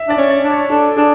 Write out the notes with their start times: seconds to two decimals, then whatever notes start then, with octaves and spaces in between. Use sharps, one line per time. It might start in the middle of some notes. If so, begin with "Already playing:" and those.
Already playing: E5
0.08 D4 D5
0.17 C#4
0.30 D5
0.43 D4
0.50 C#5
0.70 D4 A4
0.97 D4 G#4